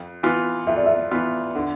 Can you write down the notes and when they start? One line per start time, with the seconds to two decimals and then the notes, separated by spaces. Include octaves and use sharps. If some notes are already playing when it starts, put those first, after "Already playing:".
Already playing: F2
0.23 E3 B3 F4
0.67 F2 E5
0.77 D5
0.86 E5
1.11 E3 B3 F4
1.55 D3